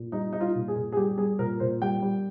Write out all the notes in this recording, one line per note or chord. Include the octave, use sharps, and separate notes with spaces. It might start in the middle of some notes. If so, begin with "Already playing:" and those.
Already playing: A#2
G3 D#4
G3 D#4
F4
A#2
G#4
A#2
G#4
G3 G4
G3 G#4
A#2 A#4
A#2 C5
G3 G5
G3